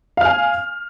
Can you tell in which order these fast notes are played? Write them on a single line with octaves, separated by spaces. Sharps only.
F5 F6 G#5